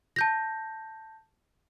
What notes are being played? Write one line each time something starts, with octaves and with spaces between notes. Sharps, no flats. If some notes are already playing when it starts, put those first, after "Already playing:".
A5 G6 A#6